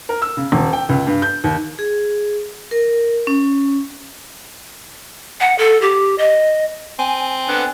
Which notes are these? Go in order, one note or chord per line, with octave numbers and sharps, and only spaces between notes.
A#4
E6
C#3
D#1
G5
C#2
G2
G6
D#2
G#4
A#4
C#4
F#5
A4
G4
D#5
C4 G#5
D3 B3